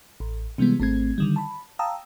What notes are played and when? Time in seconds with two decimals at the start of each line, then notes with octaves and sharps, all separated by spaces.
0.20 A1
0.58 C3 E3 G3 G#3 B3
0.80 G#1 A3 C4 G#6
1.18 D3 D#3 G3
1.36 A5 B5
1.79 F5 G5 A5 A#5 D#6 E6